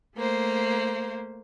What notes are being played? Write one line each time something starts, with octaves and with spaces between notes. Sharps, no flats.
A3 A#3 C5